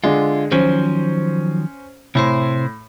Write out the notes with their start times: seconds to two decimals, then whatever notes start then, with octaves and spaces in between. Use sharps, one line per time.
0.04 D3 G#3 F4
0.52 D#3 F3 F#3 C#4 C5
2.15 A2 C3 E4 C5